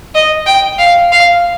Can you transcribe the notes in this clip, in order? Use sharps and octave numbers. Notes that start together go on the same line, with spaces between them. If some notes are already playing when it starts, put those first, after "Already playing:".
D#5
G5
F5
F5